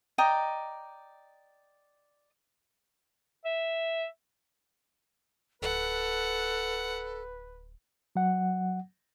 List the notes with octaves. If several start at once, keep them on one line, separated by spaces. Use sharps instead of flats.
D5 D#5 G5 A#5
E5
D1 A4 B4 F#5
F#3 F#5